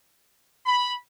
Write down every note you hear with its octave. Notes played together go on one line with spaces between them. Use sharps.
B5